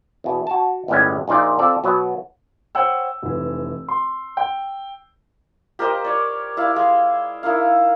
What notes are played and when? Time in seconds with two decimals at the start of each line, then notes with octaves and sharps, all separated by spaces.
0.24 E2 B2
0.47 F#4 A5
0.88 G1 A2 G3 G#3 B3 C#4
1.28 A#1 A#2 D#4 F4 D5
1.59 C4 F4 A4 D5
1.84 B2 F#3 B3
2.75 C5 C#5 F#5 G5 E6
3.23 F1 E3
3.88 C6
4.37 G5
5.79 G4 A#4 C5 D#5
6.05 C#5 D5
6.57 E4 D5 F5
6.76 G#3
7.43 D#4 E4 A#4 F5